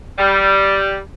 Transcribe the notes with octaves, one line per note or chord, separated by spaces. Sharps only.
G3